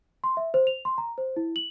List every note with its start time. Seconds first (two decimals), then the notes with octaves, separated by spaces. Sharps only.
0.24 C6
0.37 E5
0.54 C5
0.67 F7
0.85 C6
0.98 A#5
1.18 C5
1.36 E4
1.56 F#7